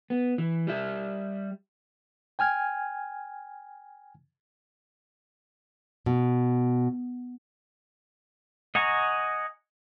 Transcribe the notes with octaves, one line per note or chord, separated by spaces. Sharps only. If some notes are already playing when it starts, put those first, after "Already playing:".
B3
E3
G3 G4 E5
G5 G#5 F6 G#6
B2
D#5 F#5 G#5 A#5 C#6